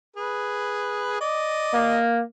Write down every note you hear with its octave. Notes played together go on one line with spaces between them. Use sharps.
G#4 B4
D5 D#5
A#3